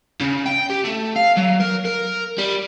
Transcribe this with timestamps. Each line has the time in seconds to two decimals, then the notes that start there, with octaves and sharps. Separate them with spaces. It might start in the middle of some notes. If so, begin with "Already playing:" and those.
0.21 C#3
0.46 G5
0.70 G4
0.84 A3
1.16 F5
1.37 F#3
1.60 A#4
1.85 A#4
2.38 G3